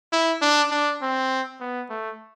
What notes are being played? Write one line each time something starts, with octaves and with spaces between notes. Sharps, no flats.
E4
D4
D4
C4
B3
A3